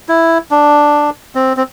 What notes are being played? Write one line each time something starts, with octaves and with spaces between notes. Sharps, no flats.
E4
D4
C4
C4